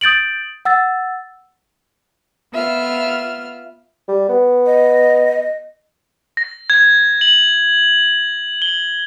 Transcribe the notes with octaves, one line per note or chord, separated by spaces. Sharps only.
D#6 G6 A6 D7 F#7
F#5 E6 A6
B3 F4 E5 F6
G3
B3
D#5
A#6
G#6
F#7
G7